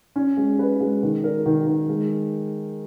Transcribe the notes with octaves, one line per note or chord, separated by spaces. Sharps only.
C#4
G#3
B4
G#3
D#3
A#4
D#3
D#3
G#3